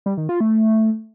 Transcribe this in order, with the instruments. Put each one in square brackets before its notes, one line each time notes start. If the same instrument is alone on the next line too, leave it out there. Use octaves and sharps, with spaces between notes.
[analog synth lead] G3
D#3
F4
A3